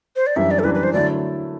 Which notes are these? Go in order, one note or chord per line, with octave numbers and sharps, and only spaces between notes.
C5
D5
F#2 E3 G3 D4 E5
D5
A4
F#2 E3 G3 D4 B4
B4
C5
D3 F#3 A3 E4 D5